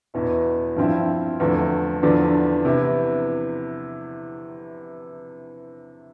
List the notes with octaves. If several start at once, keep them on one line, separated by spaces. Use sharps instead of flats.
E2 B2 B3 E4
G2 F3 C4 E4
E2 D3 F3 A3 E4
E2 D3 F3 B3 D4
C3 E3 B3 E4